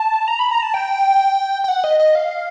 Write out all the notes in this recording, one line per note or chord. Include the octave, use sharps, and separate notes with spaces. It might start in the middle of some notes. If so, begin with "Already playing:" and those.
Already playing: A5
A#5
B5
A#5
A5
G5
G5
F#5
D#5
D#5
F5